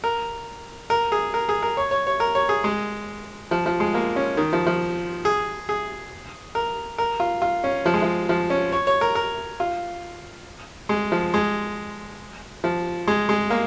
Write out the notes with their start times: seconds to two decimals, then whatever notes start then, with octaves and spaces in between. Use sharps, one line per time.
0.04 A#4
0.90 A#4
1.12 G#4
1.34 A#4
1.49 G#4
1.63 A#4
1.77 C#5
1.91 C#5
2.07 C#5
2.20 A#4
2.35 C#5
2.49 G#4
2.64 G#3
3.51 F3
3.66 F3
3.80 G#3
3.94 A#3
4.16 C#4
4.37 D#3
4.53 F3
4.66 F3
5.25 G#4
5.69 G#4
6.55 A#4
6.98 A#4
7.20 F4
7.42 F4
7.64 C#4
7.86 F3
7.94 G#3
8.02 F3
8.29 F3
8.50 C#4
8.72 C#5
8.87 C#5
9.01 A#4
9.15 A#4
9.60 F4
10.89 G#3
11.12 F3
11.34 G#3
12.64 F3
13.08 G#3
13.29 G#3
13.50 A#3